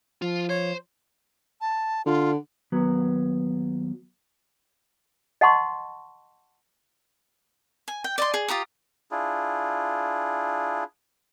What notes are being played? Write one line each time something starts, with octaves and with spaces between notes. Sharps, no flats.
F3 F4
C5 C#5
A5
D3 F4
D#2 F#3 B3
D#5 F#5 A5 C6 C#6
G#5
G5
D5 D#5 C6
G#4
F4 G4 A#5 D#6
D4 E4 F4 G#4